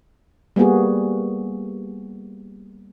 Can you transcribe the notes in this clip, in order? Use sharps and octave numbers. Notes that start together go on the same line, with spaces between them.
G3 A#3 B3 F#4 G#4